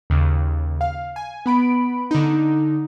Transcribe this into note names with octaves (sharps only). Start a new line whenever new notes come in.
D#2 C#3
F5
G#5
B3 B5 D7
D3 D#4